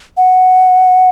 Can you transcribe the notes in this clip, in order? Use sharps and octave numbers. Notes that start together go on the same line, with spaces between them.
F#5